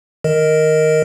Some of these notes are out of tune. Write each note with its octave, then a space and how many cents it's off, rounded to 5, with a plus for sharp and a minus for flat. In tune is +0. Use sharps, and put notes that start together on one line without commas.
D#3 +0 A#4 +0 D#5 +0